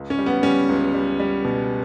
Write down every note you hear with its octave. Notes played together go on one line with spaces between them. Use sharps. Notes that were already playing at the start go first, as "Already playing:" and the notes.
Already playing: C#2
C#4
G3
B3
G3 C#4
C#2
G3
G3
B2